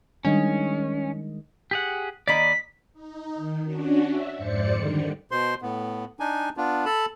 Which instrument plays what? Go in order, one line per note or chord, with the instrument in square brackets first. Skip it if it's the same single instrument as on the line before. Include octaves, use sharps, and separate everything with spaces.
[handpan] D#3 G#3 D#5 [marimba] G3 D4 [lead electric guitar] C#4
[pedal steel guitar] G4 G#4 F#5
[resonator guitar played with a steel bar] D#3 A#3 D#5 [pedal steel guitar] D5 B5 [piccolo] B6
[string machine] D#4
D#3
C#4 D4 F#4
E5
F2 G#2 C5 D5 C#7
D3 D#3 G3
[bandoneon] B2 C5 C6
A2 B3
D4 D#4 G#5
B3 D4 F4
A4 A5 B5